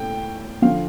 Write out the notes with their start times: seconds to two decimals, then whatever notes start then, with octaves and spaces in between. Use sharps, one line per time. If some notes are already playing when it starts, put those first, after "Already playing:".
Already playing: A2 G5
0.62 D3 F3 F5